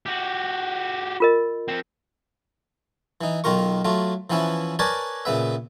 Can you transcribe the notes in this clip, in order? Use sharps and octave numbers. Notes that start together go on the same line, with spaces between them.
F#4 G4
F4 A#4 D#5
F3 C4
E3 D#4
B1 D#3 F4 A#4 C#6
F#3 A3 F4
E3 F3 B3 C#4 E4
A#4 B4 C#5 D5 G#5 A5
A#2 C#3 B3 E5